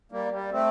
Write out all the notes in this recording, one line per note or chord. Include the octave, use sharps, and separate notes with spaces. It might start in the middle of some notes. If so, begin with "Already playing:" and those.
G3 A#3
G3
A3 C4